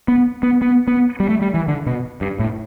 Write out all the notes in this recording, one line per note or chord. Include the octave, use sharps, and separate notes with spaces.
B3
B3
B3
B3
G3
A3
G3
E3
D3
B2
G2
A2